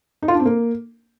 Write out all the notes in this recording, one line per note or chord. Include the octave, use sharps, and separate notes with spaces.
D#4
F4
D4
C4
A#3